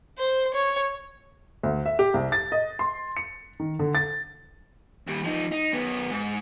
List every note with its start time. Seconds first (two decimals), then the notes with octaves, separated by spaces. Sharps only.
0.18 C5
0.54 C#5
1.63 D2
1.86 E5
1.99 G4
2.14 C2
2.32 A6
2.52 D#5
2.79 C6
3.17 C#7
3.60 D#3
3.79 D3
3.95 A6
5.07 D#2 G3
5.24 F3 D#4
5.52 D#4
5.73 F#2 B3
6.11 G#2